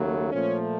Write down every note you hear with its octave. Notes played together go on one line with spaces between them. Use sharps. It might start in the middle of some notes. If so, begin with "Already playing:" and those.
Already playing: D#2 C#3 F#3 A3
A#2 F3 A3 C#4